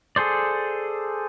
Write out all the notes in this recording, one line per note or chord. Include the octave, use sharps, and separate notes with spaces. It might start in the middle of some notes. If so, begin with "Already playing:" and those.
G#4 A4 C5 D5